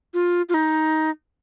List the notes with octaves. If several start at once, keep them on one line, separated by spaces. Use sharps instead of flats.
F4
F4
D#4